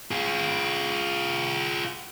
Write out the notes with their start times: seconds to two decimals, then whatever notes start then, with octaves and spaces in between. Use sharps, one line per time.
0.11 F4 G#4